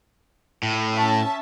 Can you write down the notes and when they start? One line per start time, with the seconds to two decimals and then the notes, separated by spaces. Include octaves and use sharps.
0.63 A2
0.93 C#4 E5 A5